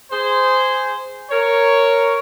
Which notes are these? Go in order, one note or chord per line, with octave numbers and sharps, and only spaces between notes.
G#4 C5
A#4 C#5